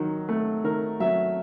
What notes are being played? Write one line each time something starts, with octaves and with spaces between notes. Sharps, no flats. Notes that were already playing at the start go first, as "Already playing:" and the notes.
Already playing: D#3 F#3
A3
D#3 A#4
F#3 E5